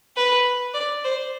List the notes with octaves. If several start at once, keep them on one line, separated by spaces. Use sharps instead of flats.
B4
D5
C5